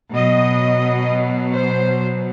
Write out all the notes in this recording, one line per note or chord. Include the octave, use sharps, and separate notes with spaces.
B2 F#3 D#5
C5